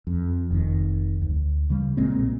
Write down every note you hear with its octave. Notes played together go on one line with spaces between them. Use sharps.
F2
F1 F2 D#3
D2
C#3 G3
B1 A#2 G#3 C4